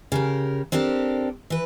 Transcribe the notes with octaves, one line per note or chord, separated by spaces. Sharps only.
C#3 G4 A#4
C4 D4 G4 A4 A#4
E3 B4